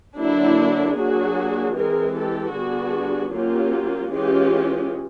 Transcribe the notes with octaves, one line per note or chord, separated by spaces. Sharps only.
D3 F#3 A#3 D4 E4
F#3 A#3 D4 F#4 G#4
E3 G#3 C4 G#4 A#4
G4 A4
D3 G3 B3 D4 F#4 G#4
F#3 A#3 C#4 F4 G4
E3 G#3 C#4 F4 G4